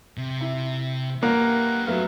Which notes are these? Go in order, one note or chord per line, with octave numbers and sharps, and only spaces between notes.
C3
E4
A#3 G4 B4 F#5
F#3 A3 B3 F5